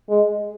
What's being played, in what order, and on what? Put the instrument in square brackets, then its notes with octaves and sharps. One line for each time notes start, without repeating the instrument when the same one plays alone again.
[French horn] G#3